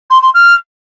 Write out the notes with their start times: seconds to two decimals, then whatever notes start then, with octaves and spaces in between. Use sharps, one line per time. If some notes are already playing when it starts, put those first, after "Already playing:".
0.10 C6
0.22 C6
0.34 F6